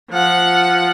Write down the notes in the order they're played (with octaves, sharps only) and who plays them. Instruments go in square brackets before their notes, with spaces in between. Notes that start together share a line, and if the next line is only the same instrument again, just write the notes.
[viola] F3 F#5